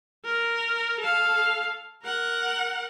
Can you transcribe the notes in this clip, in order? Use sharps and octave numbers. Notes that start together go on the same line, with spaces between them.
A#4
A4 F5
A#4 F#5